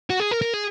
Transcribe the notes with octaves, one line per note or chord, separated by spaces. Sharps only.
F#4
G#4
A#4
A#4
G#4